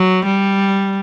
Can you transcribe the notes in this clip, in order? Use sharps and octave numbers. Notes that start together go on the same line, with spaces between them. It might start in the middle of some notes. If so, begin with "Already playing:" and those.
Already playing: F#3
G3